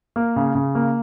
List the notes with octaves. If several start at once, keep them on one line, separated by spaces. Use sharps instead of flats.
A#3
C#3
C#3
A#3